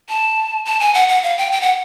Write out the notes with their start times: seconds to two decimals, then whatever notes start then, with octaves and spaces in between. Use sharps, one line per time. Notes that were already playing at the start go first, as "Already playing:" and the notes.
0.09 A5
0.65 A5
0.80 G#5
0.94 F#5
1.08 F#5
1.23 F5
1.38 G5
1.52 G5
1.61 F#5